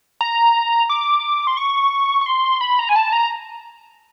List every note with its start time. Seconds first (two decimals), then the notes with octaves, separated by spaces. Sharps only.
0.21 A#5
0.89 D6
1.47 C6
1.57 C#6
2.21 C#6
2.26 C6
2.61 B5
2.79 A#5
2.89 G#5
2.96 A5
3.13 A#5